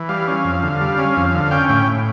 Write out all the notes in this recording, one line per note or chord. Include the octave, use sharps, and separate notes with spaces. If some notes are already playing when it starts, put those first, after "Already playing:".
Already playing: E3
G3 F5
C#4
F2
D3
G3
C#4
F2
D3
C#4 G5
A2 G5
A2